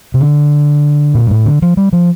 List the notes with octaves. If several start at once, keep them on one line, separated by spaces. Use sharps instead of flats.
C3
D3
A#2
G2
A2
D3
F3
G3
F3